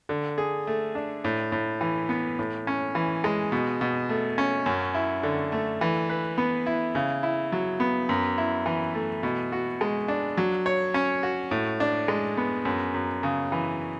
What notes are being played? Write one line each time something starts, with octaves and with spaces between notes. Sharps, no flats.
D3
G#4
A3
D4
A2
A2
E3
B3
A2
C#4
E3
G#3
B2
B2
A3
C#4
F#2
E4
D3
A3
E3
B4
B3
E4
C#3
E4
F#3
B3
F#2
E4
E3
A3
B2
F#4
G#3
D4
F#3
C#5
C#4
F#4
A2
D4
G#3
B3
F#2
F#2
C#3
E3